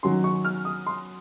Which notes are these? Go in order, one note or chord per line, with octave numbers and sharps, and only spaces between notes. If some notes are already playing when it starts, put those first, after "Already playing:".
D#3 F#3 C#4 C6
C#6
F6
D#6
C6